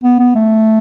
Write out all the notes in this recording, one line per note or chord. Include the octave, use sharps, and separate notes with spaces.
B3
B3
A3